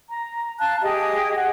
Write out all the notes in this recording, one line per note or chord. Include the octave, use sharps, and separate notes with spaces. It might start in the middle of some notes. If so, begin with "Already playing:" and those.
A#5
F5 A5 F#6
G4 G#4 D#5 D#6
G#4 F#5